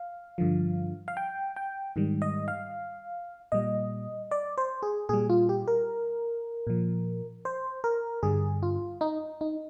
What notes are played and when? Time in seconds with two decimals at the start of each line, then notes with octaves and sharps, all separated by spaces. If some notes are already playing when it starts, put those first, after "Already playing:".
Already playing: F5
0.38 G2 D3 F3
1.08 F5
1.17 G5
1.56 G5
1.96 G#2 D#3 G3
2.22 D#5
2.48 F5
3.52 A#2 G3 D#5
4.31 D5
4.58 C5
4.83 G#4
5.09 A#2 G3 G#4
5.29 F4
5.49 G4
5.68 A#4
6.67 A#2 F3
7.45 C5
7.84 A#4
8.23 G2 D3 G3 G#4
8.63 F4
9.01 D#4
9.41 D#4